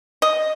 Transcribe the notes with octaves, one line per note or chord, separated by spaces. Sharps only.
D#5